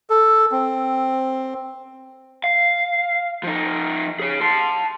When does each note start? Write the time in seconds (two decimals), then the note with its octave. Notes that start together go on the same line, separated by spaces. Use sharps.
0.10 A4
0.52 C4
2.44 F5
3.43 F3 D#4
4.19 G#4 C#5
4.41 A5 C6